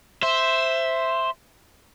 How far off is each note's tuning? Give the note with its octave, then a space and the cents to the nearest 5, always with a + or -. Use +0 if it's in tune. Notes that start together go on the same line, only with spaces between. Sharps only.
C5 +0 E5 +0